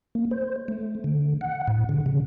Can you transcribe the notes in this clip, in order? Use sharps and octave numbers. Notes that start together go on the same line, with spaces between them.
A#3
C5
A3
D3
F#5
A2
D3
C#3